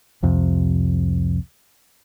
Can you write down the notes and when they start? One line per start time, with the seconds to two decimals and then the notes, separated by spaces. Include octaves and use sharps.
0.23 C2 F2 C3